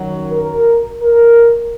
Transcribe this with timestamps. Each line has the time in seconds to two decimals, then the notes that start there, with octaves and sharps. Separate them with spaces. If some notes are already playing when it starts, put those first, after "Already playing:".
Already playing: F#2 D#3 F#3
0.32 A#4
1.02 A#4